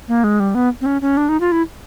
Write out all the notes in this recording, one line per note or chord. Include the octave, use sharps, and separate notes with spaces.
A#3
G#3
G3
B3
C4
C#4
C#4
D4
D#4
F4
E4